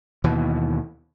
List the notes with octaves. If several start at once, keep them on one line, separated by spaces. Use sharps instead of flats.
D#2 B2 E3